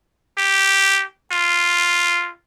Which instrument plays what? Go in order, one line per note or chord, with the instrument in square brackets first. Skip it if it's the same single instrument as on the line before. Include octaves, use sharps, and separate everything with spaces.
[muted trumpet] G4
F4